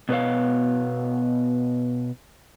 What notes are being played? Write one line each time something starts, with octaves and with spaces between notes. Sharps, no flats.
B2 B3 C#5 F5